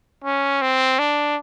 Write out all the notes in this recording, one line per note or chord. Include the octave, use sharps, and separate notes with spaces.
C#4
C4
D4